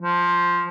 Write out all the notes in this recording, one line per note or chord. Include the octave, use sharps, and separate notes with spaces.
F3